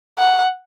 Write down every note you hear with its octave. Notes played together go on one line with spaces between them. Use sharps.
F#5